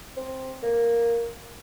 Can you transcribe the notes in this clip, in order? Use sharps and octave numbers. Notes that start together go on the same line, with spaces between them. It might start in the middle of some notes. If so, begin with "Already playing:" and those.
C4
A#3